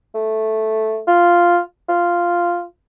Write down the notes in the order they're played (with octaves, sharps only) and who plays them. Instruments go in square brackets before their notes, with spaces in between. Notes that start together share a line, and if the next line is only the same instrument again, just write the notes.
[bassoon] A3
F4
F4